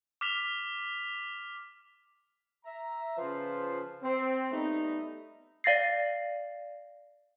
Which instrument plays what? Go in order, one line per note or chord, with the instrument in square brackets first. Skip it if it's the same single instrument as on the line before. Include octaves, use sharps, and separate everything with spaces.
[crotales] D6 F6 B6 F7
[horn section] E5 A#5
C#3 F3 F4 B4 C5 A5
C4
G3 A3 B3 D#4
[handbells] D5 F5 A6 A#6 C7